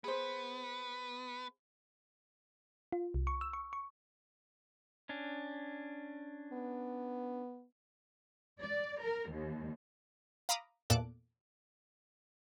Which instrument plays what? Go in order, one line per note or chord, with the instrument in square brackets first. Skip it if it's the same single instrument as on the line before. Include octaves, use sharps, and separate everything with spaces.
[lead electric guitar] B3 [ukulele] G#4 C5
[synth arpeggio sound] F4
C2
C#6
E6
C#6
C#6
[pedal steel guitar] C#4 D4
[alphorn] B3
[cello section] D5
A#4
D#2
[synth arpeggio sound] F5 A#5 B5 D6 D#6
E2 A#2 A4 A5 D6 F#6